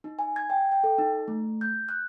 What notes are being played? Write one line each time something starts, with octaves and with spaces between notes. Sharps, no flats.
D#4
G#5
G#6
G5
G5
A4
D#4
A3
G6
F#6